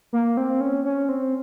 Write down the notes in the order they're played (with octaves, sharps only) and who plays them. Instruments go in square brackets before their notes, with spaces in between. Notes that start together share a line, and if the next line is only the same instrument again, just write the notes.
[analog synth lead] A#3
C4
C#4
C#4
C4